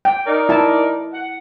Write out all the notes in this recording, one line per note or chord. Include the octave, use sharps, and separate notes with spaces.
G5
D#4 A#4 D5
E4 A5
F#5